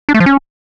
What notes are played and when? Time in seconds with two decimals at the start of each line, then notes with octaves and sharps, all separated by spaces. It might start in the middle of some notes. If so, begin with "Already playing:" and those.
0.09 D4
0.14 A3
0.20 F3
0.26 C#4